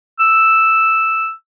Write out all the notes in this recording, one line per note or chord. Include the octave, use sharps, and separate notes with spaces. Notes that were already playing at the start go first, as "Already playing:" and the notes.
E6